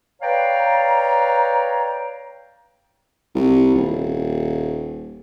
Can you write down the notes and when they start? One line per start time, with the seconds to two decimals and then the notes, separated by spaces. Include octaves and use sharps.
0.22 B4 C#5 D5 F5 G5 A#5
3.35 C2
3.75 D#1